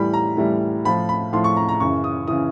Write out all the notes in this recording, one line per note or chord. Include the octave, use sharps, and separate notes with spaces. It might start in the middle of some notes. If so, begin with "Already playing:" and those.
Already playing: A2 E3 G3 B5
A#5
A2 E3 G3
A2 F3 B5
B5
A2 F3 C6
C#6
A#5
A#5
F#2 C#3 E3 C#6
D#6
C#3 E3 D#6